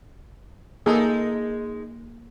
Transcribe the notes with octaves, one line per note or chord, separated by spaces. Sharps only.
G#3 A#3 D#4 G#4 A4